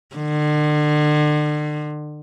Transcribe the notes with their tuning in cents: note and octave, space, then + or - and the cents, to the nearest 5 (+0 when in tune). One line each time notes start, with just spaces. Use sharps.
D3 +40